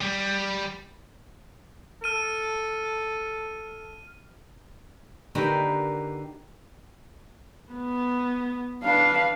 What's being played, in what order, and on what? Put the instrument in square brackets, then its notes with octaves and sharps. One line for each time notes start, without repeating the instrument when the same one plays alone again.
[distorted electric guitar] G3
[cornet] A4 [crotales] F6 D#7
[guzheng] D3 A#3 D#4 F#4 G4 B4
[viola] B3
[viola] D4 B4 [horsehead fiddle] F5